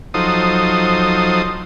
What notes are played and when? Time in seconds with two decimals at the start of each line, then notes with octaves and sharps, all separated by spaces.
0.14 F3 F#3 D#4 A4 C5 D#6